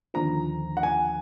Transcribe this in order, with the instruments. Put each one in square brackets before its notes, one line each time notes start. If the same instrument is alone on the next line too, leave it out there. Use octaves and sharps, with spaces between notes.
[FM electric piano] D#2 D3 F3 [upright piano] A#5
[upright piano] F#5
G#5